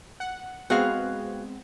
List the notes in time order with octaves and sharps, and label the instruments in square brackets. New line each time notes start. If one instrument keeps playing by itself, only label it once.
[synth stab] F#5
[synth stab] G#3 B3 C4 [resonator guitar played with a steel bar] F#4 G#4 F5